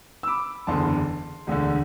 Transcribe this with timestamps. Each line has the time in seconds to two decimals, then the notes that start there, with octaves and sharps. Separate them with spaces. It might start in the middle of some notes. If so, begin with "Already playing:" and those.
0.23 E6
0.27 B5 D6
0.67 F#1 E2 D3 A5 C6
1.47 E1 D2 D3